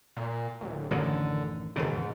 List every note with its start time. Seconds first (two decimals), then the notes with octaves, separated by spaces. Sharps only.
0.17 A#2
0.61 D1
0.91 A1 F#2 D3 D#3
1.76 E1 D#2 G#2 C#3